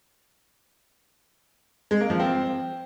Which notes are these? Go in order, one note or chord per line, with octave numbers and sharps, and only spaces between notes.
G#3
A#3
F3
C4